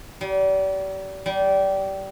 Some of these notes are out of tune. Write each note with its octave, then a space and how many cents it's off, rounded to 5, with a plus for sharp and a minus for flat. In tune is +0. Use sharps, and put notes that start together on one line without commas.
G3 -35
G3 -20